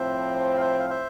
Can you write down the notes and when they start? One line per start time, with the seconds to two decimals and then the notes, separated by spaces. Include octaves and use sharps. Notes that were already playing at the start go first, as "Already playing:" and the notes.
Already playing: A2 F3 C4 C5 E5
0.57 F5
0.61 C5 E5
0.80 F5
0.90 C5 E5